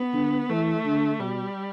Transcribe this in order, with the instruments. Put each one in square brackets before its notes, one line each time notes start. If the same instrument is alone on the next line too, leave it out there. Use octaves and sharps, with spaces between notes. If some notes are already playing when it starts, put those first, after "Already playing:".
Already playing: [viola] B3
[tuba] D3
[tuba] E3 [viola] A3
[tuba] D3
[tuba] B2 [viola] G3